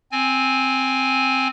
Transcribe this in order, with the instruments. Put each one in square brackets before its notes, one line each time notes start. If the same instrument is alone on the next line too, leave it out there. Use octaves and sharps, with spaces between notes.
[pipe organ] C4 G#5